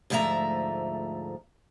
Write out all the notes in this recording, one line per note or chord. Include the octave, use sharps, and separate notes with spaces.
D2 G#2 F3 A3 E5 A#5